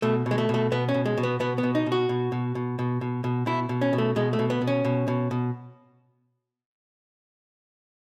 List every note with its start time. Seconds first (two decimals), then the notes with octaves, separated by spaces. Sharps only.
0.02 B2 A3
0.26 B2
0.31 G#3
0.38 A3
0.49 B2 A3
0.72 B2 B3
0.89 C#4
0.94 B2
1.06 G#3
1.18 B2
1.23 B3
1.40 B2 B3
1.58 B3
1.63 B2
1.75 D#4
1.86 B2
1.92 F#4
2.09 B2
2.32 B2
2.55 B2
2.79 B2
3.01 B2
3.24 B2
3.46 B2 E4
3.69 B2
3.81 C#4
3.93 B2
3.98 A3
4.16 B2 G#3
4.33 A3
4.39 B2
4.50 B3
4.62 B2
4.67 C#4
4.85 B2
5.08 B2
5.31 B2